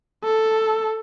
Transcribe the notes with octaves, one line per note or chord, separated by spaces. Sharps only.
A4